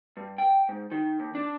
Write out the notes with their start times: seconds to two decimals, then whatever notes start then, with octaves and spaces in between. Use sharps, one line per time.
0.17 G2
0.38 G5
0.69 G#2
0.91 D#3
1.20 D#2
1.35 D4